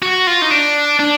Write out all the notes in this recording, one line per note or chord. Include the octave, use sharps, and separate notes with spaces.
F#4
F4
D#4
D4
D4